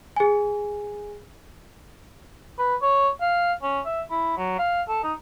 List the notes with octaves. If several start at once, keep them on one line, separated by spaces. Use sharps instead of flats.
G#4 G#5
B4
C#5
F5
C#4
E5
E4
F#3
F5
A4
D#4